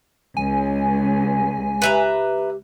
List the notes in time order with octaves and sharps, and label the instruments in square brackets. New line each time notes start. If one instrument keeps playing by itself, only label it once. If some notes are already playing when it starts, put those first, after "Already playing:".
[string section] C#2 [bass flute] C#4 [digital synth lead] G#5
[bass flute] G4 [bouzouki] B4 E5 A#5